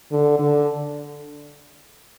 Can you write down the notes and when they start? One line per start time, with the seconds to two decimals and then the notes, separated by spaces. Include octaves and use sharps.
0.12 D3
0.39 D3